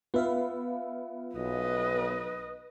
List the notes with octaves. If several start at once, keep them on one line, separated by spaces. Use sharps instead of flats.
B3 F4 E5 F5
B1 B4 D#5